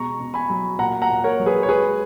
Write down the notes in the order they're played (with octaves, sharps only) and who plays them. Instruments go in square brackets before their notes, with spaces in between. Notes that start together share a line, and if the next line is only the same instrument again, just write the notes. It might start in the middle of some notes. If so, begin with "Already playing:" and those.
Already playing: [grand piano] B2 G#3 A#5 C#6
B2
G#5 B5
F#3
A#2 F#5 A#5
F#5 A#5
A#2
A#4 C#5
F#3
G#4 B4
C#5
G#3 G#4 B4